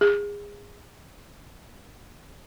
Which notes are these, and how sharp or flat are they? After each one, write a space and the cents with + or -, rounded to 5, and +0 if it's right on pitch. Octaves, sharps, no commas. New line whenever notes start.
G#4 -25